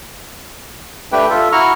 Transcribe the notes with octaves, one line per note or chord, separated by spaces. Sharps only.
A3 D4 G4 B4 G5
F4 A4 E5
E4 F#4 A#5 C#6 F6